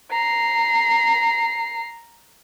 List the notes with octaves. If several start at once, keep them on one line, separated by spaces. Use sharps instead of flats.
A#5 C7